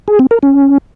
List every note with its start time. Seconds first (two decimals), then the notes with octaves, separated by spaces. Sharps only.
0.08 G#4
0.19 C4
0.31 A#4
0.43 C#4